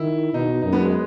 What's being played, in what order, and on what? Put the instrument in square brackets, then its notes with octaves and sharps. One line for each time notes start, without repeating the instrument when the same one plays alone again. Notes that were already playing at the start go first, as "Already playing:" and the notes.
Already playing: [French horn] D#3 [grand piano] E4
[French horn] B2 [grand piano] D#4
[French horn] F#2 [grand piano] D#4
[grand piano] B3
G#3